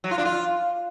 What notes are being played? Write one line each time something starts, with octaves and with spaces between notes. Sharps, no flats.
F#3
F4
D4
F4